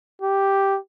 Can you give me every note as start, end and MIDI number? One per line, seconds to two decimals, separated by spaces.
0.22 0.78 67